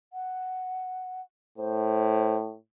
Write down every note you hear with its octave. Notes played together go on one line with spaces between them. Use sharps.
F#5
A2 C5